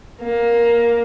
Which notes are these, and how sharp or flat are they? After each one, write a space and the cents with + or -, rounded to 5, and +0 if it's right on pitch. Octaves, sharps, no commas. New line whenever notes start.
A#3 +10